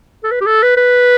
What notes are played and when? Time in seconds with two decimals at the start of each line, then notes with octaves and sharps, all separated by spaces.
0.24 A4
0.31 B4
0.41 G4
0.46 A4
0.63 B4
0.77 B4